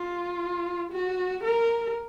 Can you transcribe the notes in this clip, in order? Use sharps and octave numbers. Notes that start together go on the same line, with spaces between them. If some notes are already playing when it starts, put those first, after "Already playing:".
Already playing: F4
F#4
A#4